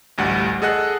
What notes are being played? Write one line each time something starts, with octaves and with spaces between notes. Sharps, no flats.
A1 D2 G3 F#5
G#4 A4 D#5 F#5 F#6